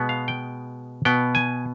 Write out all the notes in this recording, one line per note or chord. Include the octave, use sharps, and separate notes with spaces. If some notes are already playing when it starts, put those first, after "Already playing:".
Already playing: B2 G#3 B3
F5
G5
B2 B3 G5
G#5